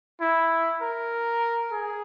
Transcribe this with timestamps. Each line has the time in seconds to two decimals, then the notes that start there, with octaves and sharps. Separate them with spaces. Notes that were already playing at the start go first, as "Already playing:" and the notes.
0.21 E4
0.81 A#4
1.71 G#4